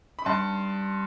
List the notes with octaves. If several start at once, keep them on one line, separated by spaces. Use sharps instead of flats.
B5
G2 A5 C6